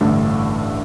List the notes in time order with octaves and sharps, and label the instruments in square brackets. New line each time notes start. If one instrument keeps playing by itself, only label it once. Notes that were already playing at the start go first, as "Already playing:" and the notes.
[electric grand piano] A1 G2 D3 A3 D4